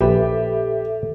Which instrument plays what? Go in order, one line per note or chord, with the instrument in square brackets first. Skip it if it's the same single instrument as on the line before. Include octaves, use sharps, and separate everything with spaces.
[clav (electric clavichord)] A#1 B4 [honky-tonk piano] G4 [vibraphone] A4 E5